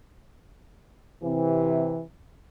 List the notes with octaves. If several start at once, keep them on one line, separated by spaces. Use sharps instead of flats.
C3 E3